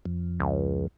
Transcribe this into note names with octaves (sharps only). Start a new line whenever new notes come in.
F2
C#2